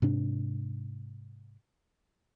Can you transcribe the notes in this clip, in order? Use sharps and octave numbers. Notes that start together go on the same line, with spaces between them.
G#2 C3 D4